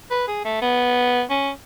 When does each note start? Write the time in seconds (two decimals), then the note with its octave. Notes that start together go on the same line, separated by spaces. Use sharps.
0.11 B4
0.28 G#4
0.45 A3
0.62 B3
1.30 C#4